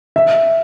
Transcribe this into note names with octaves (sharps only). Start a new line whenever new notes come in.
E5